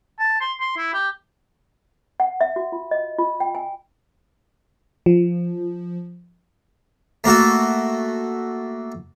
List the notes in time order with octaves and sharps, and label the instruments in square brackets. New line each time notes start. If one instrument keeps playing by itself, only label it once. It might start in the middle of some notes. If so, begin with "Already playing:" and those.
[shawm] A5
C6
C6
E4
G4
[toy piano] F#5
E5
F#4
F4
D#5
F4
G5
G#5
[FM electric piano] F3
[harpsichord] A3 A#3 F#4 A4